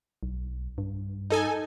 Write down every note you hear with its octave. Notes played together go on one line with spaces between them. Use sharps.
B1
G2
D#4 A4 G#5